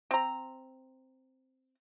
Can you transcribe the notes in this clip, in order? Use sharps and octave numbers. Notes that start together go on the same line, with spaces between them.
C4 A#5